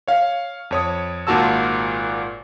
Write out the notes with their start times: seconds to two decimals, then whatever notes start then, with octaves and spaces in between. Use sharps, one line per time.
0.08 C#5 F5
0.71 F2 C#5 D#6
1.27 G#1 A#2 F4 F#4 A5 E6